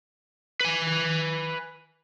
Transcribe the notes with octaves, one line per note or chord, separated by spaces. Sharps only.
B4 G#5